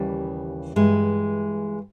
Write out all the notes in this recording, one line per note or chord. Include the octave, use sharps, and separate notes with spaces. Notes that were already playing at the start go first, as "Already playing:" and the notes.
Already playing: D#2 C#3 E3 G3
G2 E3 G#3